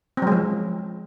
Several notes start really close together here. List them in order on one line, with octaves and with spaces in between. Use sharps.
C4 F#3 G#3 F3